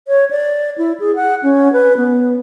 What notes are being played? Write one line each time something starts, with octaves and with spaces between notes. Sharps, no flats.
C#5
D5
E4
G#4
F#5
C#4
B4
B3